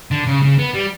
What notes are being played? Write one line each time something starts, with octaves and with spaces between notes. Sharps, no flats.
D3
C#3
C#3
B3
G3